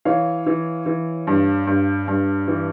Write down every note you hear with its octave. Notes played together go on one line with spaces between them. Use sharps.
E3 C#5 F5
E3
E3
G2
G2
G2
E3